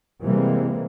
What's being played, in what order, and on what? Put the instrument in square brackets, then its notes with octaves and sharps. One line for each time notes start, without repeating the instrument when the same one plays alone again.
[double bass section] C3 E3 G3 G#3 A#3 C4